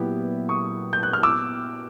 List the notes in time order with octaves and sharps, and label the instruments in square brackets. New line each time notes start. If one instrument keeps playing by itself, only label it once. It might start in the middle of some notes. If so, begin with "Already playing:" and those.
Already playing: [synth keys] A#2 F#3 B3 E4 G4
[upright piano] C#6 D#6
G6
F#6
F6
D6 E6